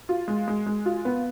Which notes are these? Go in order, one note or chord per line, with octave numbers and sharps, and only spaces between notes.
F4
G#3
G#3
G#3
F4
B3